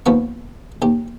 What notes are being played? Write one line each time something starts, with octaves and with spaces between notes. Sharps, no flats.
D#2 F3 B3 C#6
D#2 G4